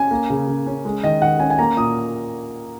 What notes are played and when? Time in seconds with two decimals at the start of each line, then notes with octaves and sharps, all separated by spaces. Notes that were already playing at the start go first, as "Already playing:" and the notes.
Already playing: C#4 G#5
0.11 A#3
0.30 C#3
0.47 C#3
0.66 C#4
0.85 G#3
1.04 D#3 D#5
1.22 D#3 F#5
1.40 C#4 G#5
1.50 G#5
1.59 A#3 A#5
1.77 A#2 D#6